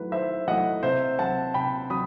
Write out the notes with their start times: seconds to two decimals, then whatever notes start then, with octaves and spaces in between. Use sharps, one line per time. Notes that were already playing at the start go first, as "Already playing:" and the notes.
Already playing: D#3 F#3 A3 E4 B4
0.12 D#3 C5 E5
0.47 F#3 A3 E4 D#5 F#5
0.83 C3 C5 E5
1.19 F#3 C4 F#5 A5
1.54 C3 G5 B5
1.90 F#3 B5 D#6